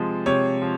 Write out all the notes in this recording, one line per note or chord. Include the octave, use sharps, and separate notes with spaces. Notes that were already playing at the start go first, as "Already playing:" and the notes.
Already playing: C3 F3 G#3
C3 C#5
F3